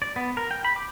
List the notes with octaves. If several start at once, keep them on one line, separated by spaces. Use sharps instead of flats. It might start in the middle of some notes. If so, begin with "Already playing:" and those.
D5
B3
A#4
G5
B5
D6